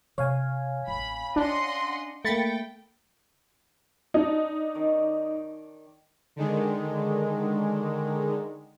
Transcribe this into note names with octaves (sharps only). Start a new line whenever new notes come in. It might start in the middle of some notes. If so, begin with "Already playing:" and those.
C3 C#5 F5 G#5
A1 C4 B5
C#4 D4 D#5 F#5 C6
A3 A#3 G5 B5 A6 C#7
D4 D#4
D#3 C#5 D5
D3 D#3 G#3